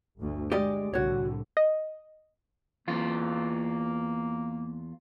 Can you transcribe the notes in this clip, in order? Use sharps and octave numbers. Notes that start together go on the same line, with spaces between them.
G1 D2
G#3 G4 D5 D#5
C2 A2 D3 F#4 C#5
D#5
E2 A#3 F4